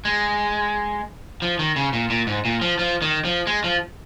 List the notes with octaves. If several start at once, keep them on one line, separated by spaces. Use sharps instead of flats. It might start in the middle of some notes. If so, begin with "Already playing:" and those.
G#3
F3
D#3
C#3
A#2
A#2
G#2
A#2
F3
F3
D#3
F3
G#3
F3